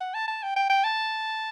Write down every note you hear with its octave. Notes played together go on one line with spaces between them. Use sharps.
F#5
A5
A5
G5
G5
G5
A5